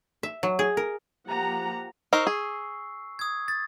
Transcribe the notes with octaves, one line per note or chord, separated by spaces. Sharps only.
E5
F#3
G#4
A#4
F3 A#3 G4 F#5 A#5
D#4 A#4 C5 C#6 E6 C7
G#4
D#6 G#6
A6